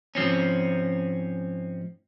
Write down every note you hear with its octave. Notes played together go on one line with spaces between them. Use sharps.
G#2 F3 C4 C#4